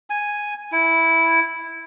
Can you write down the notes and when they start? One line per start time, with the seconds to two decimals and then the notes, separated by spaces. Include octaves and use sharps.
0.10 G#5
0.72 E4